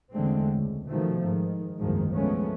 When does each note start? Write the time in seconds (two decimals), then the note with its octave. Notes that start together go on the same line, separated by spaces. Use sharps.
0.12 E2 D3 G#3 A3 C4
0.55 C#2
0.89 B2 D#3 F3 A3
1.24 G#2 D#3
1.78 F#1 C2 G#2 D#3 F3 G#3
2.11 F3 G#3 A3 B3 C#4